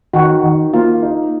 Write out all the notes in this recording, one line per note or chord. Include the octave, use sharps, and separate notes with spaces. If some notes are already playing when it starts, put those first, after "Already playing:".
D#3 F#4
D#3
A#3 F4
D#4